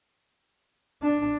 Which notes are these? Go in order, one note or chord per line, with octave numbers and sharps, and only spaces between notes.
D4